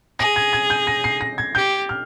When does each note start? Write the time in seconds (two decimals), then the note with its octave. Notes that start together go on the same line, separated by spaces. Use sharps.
0.19 G#4 A#6
0.36 G#6
0.53 G#6
0.70 G6
0.87 A#6
1.04 C7
1.21 A#6
1.38 G#6
1.55 G4 G6
1.89 F6